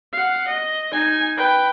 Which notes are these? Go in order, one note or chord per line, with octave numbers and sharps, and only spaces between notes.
F5 F#5
D#5
D#4 G#5
B4 G5